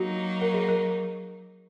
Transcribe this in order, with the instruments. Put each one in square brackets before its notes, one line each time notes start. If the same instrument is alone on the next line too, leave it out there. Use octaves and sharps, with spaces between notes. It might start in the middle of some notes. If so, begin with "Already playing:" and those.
Already playing: [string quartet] F#3 A#3 D#4 [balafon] F#4
[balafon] A#4
G#4
A#4